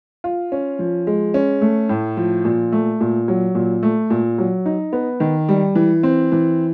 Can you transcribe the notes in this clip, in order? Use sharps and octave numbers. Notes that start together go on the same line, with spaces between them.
F4
C#4
F3
G#3
C#4
A3
A2
F3
A#2
A3
A#2
F#3
A#2
A3
A#2
F#3
D#4
B3
D#3
G3
E3
C4
E3